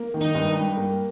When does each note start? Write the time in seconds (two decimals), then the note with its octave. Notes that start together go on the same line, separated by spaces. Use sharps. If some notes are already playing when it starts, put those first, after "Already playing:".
Already playing: A#3
0.14 D#3
0.21 D#4
0.35 G2
0.56 G3
0.77 A#3